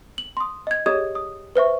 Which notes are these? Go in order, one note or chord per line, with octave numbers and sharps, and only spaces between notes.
F#7
C6 D#6
D#5 G#6
G4 G#4 C#5 D#5 D#6 G#6
D#6
B4 C5 E5 C#6